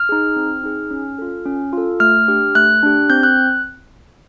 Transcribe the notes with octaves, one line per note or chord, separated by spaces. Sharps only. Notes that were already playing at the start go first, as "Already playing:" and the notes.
Already playing: F6
D#4 G#4
C4
D#4 G#4
C#4
F4 A4
C#4
F4 A4
A3 F6
D4 G4
A3 F#6
D4 G4
C4 G6
F#6